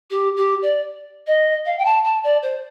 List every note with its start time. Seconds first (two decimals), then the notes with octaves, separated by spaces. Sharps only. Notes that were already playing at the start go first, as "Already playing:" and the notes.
0.10 G4
0.36 G4
0.62 D5
1.27 D#5
1.65 F5
1.78 G5
1.85 A5
2.04 A5
2.23 D5
2.42 C5